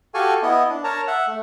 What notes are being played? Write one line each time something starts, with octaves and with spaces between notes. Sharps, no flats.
F#4 G4 A4 F5 G#5 C#6
B3 E4 D#5
D4
A#4 C#5 A5 A#5
E5 F#5
A3